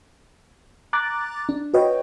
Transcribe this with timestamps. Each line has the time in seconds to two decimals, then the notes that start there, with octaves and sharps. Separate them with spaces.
0.93 A#5 D6 F#6 A6
1.49 D4
1.74 F#4 B4 C#5 D#5 G5